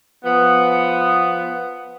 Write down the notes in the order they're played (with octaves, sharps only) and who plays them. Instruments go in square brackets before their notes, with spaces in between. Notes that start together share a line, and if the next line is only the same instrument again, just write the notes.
[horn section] F3 B3